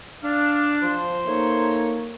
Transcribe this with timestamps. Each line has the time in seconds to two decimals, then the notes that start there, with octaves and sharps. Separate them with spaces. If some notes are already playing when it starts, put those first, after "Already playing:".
0.23 D4 F5
0.83 F3 C5
1.27 A3 A#3 D#4 C#5